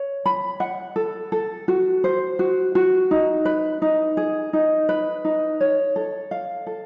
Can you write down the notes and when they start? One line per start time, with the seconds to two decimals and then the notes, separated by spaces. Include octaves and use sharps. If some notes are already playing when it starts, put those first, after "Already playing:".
Already playing: C#5
0.26 B5
0.60 F#5
0.96 A4
1.32 A4
1.68 F#4
2.04 C5
2.39 F#4
2.75 F#4
3.11 D#4
3.45 B4
3.82 D#4
4.17 G#4
4.53 D#4
4.89 B4
5.25 D#4
5.61 C#5
5.96 A4
6.31 F5
6.67 A4